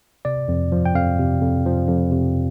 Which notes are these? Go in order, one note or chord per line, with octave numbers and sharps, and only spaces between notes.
C3 D5
F2
F3
G5
F2 F5
C3
F2
F3
F2
C3